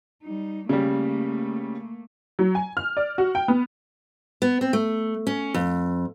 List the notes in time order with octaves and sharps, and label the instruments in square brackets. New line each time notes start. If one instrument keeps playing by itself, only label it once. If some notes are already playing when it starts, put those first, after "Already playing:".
[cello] G3 D#4
[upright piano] C#3 G3 [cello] A3 A#3
[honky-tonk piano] F#3
G#5
F6
D5
F#4
G5
B3
[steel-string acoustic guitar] B3
C4
A3
C#4
F2